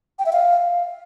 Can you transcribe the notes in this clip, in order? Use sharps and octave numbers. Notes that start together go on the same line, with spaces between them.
G5
E5
F5